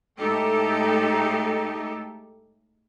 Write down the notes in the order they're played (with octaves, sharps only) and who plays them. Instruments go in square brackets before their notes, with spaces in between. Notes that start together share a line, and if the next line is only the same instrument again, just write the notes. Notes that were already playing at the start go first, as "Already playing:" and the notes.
[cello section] A2 G#3 A3 D#4 G4 A4